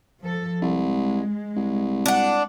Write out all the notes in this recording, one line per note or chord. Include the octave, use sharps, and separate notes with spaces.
F3 A4
C2 G#3
C2
D4 F#5